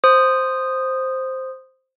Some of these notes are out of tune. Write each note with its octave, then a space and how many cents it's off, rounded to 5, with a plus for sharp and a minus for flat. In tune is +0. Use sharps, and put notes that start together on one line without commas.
C5 +0 D#6 -10